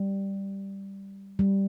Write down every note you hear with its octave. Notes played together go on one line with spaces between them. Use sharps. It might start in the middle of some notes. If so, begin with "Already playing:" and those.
Already playing: G3
G3